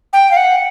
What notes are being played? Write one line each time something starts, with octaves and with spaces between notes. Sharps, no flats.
G5
F5
F#5